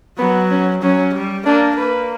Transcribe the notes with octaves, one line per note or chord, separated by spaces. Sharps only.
F#3 B3
C#4
F#3 C#4
G3
A#3 D4
A#3 B4